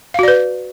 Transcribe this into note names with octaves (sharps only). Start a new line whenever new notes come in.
F#4 B4 D5 F5